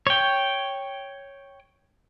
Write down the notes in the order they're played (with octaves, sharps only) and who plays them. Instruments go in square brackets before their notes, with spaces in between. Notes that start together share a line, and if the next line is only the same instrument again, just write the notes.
[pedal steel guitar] C#5 G5